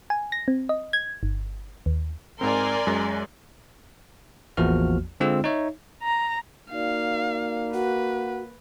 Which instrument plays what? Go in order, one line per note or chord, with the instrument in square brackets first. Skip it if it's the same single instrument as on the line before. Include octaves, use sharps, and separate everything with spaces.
[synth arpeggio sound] G#5
A#6
C4
D#5
G#6
G1
D#2
[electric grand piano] G#2 C4 [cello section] A#4 [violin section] D5 G#5 C6
[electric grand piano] F#2 G#3 A#6
[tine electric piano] A1 E2 F3 A#3 F#4 F6
D3 G#3 C4 F4 E6
D#4 C#5 E5
[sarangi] A#5
[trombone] A#3 [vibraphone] D#4 F#4 D5 [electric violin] F5
[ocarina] F#4 [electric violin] B4 [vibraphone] F#5